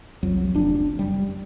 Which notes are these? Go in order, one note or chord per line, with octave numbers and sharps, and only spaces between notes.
C2 F2 F#3
F1 D4
F#1 G3